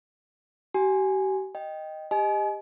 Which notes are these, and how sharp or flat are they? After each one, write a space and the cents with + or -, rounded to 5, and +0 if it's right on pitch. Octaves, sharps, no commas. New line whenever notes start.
G4 -40 G#5 +0
D#5 +0 G5 +0
G4 +25 D#5 +0 G#5 +35